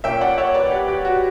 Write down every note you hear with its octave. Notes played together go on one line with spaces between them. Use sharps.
A#2 A#3 C#4 E5 G5
D5 F#5
C#5 E5
B4 D5
G4 B4
G4
F#4